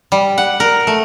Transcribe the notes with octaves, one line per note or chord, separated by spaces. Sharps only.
G3
F#5
A#4
A3